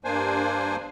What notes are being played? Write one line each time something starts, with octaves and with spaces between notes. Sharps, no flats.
G2 A#3 D4 C5 G#5